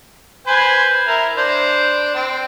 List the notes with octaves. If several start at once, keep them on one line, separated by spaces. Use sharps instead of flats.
B4 C5 G#5
E4 A#4
D4 C5
C4